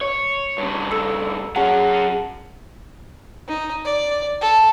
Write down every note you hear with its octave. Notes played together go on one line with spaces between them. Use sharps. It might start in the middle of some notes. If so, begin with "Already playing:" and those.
C#5
G2 C#3
A4 E6 C#7
F#3 C#4 G#4 F#5 A5
D#4
D5
A4